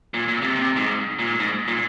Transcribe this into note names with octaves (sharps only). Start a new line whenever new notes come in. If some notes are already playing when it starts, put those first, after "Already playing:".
A#2
A#2
C3
C3
G#2
A#2
G#2
A#2